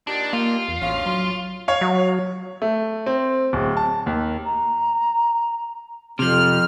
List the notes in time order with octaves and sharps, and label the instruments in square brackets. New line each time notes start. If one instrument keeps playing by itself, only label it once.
[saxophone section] A#2 D#4 G4 [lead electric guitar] D4
[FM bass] A#3 [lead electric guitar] F4
[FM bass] E2
[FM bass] A1 [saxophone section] D2 C#4 F5
[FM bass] F#3
[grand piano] C#5 F5
[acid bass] F#3
[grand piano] A3
C4
D1
A5
D#2
[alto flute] A#5
[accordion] F2 F6 [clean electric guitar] C3 F3